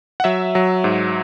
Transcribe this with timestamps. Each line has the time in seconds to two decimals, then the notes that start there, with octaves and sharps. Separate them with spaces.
0.20 F#5
0.24 F#3 E5
0.55 F#3
0.84 G#2